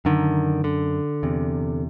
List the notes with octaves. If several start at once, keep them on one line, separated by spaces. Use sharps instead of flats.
F#2 D3 D#3
D3
E2 C3